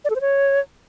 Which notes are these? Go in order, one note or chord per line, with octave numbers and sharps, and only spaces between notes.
D5
A4
C5
C#5